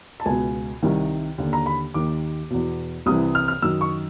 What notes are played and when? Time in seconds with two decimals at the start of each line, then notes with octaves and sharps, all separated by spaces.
0.20 A5
0.26 C#2 B2 G#5
0.83 C2 C3 D#3
1.38 D#2 D3
1.53 A#5
1.66 B5
1.94 D#2 D#3 D6
2.50 E2 B2
3.06 C2 C3 E3 D#6
3.35 F6
3.48 F6
3.62 F#2 D#3 E6
3.81 C#6